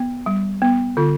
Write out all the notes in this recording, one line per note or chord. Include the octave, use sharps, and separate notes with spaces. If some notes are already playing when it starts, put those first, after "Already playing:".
Already playing: B3
G3
B3
D3 F4